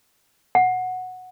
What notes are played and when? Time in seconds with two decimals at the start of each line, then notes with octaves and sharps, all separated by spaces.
0.55 F#5